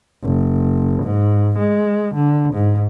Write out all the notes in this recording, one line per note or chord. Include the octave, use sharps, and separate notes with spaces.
F#1
G#2
G#3
D3
G#2